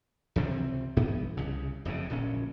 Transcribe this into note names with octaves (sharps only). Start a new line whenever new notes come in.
C#2 C3 E3 C4
B1 G2 E3 B3
C2 C#3
F#1 F2 A2 C#3
D1 A#1 A#2 C#4